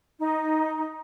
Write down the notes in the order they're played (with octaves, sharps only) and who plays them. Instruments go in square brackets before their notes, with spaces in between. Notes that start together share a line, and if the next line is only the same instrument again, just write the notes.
[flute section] D#4